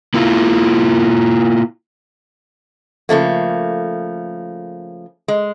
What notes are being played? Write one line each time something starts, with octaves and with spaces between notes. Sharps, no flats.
A#3 E4 F4
C#3 F3 A3 A#3
G#3